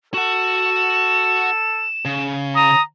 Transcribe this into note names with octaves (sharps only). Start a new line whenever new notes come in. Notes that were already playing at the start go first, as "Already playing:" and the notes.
F#4 A4 F#5 E7
C#3
A#5 D#6